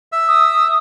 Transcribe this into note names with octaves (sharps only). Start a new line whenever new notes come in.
E5 E6
D#6